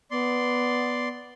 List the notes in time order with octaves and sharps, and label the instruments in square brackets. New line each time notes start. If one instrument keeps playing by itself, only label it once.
[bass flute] B3 [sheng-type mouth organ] D5 C6